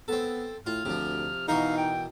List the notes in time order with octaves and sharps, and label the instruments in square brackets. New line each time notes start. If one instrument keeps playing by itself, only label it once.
[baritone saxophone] B3 [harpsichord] C4 A4
[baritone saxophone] A2 [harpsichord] F4 [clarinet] F6
[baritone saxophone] D2 [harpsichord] C3 F3
[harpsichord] B2 E3 A#4 [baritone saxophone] D#4 [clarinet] F5
[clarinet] G5